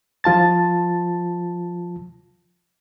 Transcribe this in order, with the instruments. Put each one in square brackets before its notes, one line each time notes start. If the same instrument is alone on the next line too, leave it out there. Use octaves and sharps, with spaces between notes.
[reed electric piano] F3 F4 A5 A6